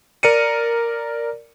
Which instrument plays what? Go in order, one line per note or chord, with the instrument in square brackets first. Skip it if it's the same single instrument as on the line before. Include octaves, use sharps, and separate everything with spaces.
[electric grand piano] A#4 D5 C#7 D#7